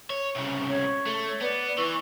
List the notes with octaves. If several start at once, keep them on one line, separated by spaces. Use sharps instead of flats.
C#5
C2 C#3
C#5
A3
B3 D5
E3 C#6